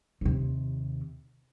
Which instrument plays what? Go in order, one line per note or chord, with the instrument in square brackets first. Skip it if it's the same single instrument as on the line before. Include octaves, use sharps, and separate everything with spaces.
[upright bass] D#2 C3